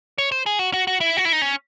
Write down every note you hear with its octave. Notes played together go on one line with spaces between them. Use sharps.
C#5
C5
G#4
F#4
F#4
F#4
E4
F#4
E4
D#4
C#4